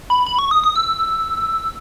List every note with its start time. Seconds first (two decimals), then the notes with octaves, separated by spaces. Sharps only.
0.10 B5
0.26 B5
0.39 C#6
0.51 D#6
0.64 D#6
0.76 E6